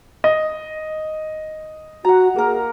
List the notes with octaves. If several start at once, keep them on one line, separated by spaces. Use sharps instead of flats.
D#5
F#4 F#5 A#5
A#3 G#4 A#4